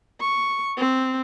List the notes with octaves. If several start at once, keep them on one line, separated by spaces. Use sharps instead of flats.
C#6
C4